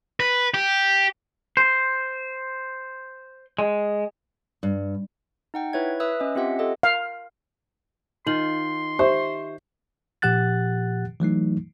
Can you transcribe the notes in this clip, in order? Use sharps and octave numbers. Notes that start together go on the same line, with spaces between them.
B4
G4
C5
G#3
G2
D#4 F#5 G5
E4 B4 C#5 E5 G#6
B4 E5 D#6 E6 F#6
C#4 D#5
C4 F4 G4 E5 F#5
G4 A4 D#5
F5
D#3 D#4 F4 C6 F#7
G4 C5 E5 C#6
A#2 F3 G4 F#5 F#6 A6
E3 F#3 A3 D#4